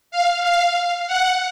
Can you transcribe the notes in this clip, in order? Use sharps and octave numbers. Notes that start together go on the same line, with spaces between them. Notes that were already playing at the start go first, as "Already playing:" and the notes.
F5
F5
F#5